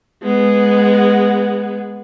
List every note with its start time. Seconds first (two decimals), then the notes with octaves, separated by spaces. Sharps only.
0.23 G#3 B3